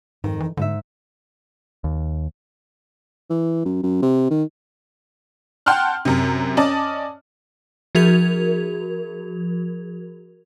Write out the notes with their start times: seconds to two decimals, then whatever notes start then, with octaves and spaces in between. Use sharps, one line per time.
0.24 F2 G#2 D#3
0.40 E3
0.57 G#2 D3 D#4 E5
1.84 D#2
3.30 E3
3.65 F#2
3.83 F#2
4.02 C3
4.30 D#3
5.66 F#5 G5 A5 C6 F6 F#6
6.05 F#2 C3
6.57 C#4 D5 D#5 A5
7.95 F3 F#4 G#4 A#4 G#6 F7